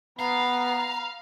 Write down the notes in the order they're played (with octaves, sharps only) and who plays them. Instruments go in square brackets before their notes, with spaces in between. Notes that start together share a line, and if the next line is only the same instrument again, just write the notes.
[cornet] B3 [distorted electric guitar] F5 [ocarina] A#5 [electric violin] B5